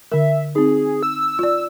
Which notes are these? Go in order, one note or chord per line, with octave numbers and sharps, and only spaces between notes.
D3 A#4 E5
C4 D#4 G#4
E6
F4 D5